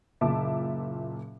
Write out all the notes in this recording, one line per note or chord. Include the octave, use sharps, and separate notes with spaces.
F#1 A#2 E5 A5 D6